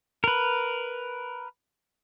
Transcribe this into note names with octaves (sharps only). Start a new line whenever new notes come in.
A#4 B4